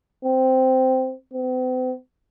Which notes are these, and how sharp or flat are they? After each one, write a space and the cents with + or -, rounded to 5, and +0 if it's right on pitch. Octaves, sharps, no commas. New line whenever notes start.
C4 -10
C4 -45